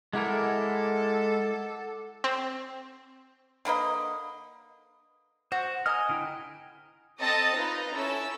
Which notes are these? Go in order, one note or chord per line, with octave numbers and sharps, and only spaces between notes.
G#3 E4 A4 A#4 F#5 D6
C4
D3 A#3 B4 D#5
F#4 C5
D#5 G#5 A#5 F6
D3 E4 G5
C4 A4 D#5 A5 D#6 A6
D#4 F4 B4 A#5
C#4 E4 A4 E6